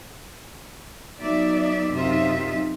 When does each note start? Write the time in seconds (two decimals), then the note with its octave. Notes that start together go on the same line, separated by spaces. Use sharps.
1.18 F#3 B3 D#4 D5 E5
1.91 F#2 C3 D#4 F4 E5